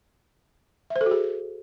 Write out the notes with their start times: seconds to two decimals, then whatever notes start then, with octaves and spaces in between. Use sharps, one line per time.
0.90 E5
0.96 C5
1.01 A4
1.06 F#4
1.11 G#4